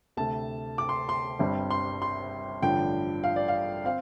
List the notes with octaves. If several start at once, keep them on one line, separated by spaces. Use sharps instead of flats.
D2 C3 A3 A5
D6
C6
C6
G1 G2 G3 C4
C6
C6
A1 G2 D3 F3 G5
F5
D5
F5
C4 F5